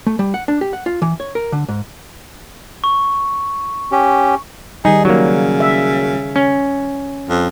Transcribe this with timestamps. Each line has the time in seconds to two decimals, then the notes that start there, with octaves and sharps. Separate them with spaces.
0.07 A3
0.19 G3
0.34 F#5
0.48 D4
0.61 G4
0.73 F#5
0.86 F4
1.02 E3
1.20 C#5
1.35 A#4
1.52 D3
1.69 G#2
2.84 C#6
3.92 C#4 G4
4.85 D#3 G3 D#4 G#4
5.05 C#3 F#3 A#3
5.60 E5
6.36 C#4
7.29 F2